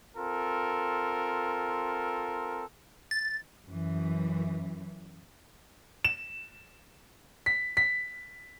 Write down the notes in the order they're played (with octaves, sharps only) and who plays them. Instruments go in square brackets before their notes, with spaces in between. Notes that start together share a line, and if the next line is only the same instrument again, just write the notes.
[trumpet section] C4 F4 A4 A#4
[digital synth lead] A6
[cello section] F#2 E3
[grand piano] E7
B6
B6